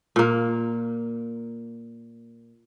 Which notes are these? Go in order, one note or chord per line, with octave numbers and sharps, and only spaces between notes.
A#2 A#3